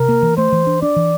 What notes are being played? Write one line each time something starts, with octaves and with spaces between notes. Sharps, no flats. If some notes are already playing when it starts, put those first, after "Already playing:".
Already playing: C3 A#4
A#3
E3
A3 C5
E3
D4
D4 D5
E3